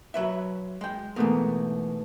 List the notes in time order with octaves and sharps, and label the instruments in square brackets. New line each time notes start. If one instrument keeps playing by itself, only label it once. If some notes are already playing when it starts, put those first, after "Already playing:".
[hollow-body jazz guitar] F#3 B4 E5
G#3 G5
[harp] G#2 B2 A3 [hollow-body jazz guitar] E3 A#4